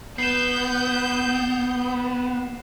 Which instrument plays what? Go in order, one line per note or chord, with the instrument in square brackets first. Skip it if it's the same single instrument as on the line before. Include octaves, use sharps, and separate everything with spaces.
[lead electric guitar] B3 [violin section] G6 [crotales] C7 E7